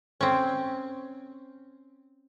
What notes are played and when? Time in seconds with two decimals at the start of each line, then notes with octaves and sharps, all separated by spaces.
0.21 C4 C#4